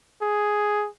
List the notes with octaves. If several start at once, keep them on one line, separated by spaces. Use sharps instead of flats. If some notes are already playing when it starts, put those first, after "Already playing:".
G#4